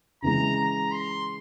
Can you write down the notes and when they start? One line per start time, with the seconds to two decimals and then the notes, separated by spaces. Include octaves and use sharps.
0.22 C#3 E3 G#3 A#5
0.56 A#5
0.92 C6